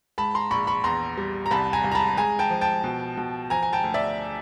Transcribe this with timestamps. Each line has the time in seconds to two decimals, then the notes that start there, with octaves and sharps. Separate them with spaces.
0.18 G#2 A5 B5
0.35 A#5 C6
0.51 A#1 B5 C#6
0.67 B5 C#6
0.84 E2 A#5 C6
1.17 G3
1.46 A#5
1.51 C2 A5 B5
1.73 G#5 A#5
1.84 C2
1.92 A#5
1.95 A5 B5
2.17 G#3 G#5 A#5
2.39 G5 A5
2.50 F3
2.61 G5 A5
2.84 B2
3.17 B2
3.50 F3 G#5 A#5
3.63 G#5
3.73 G5 A5
3.84 D2
3.94 D5 E5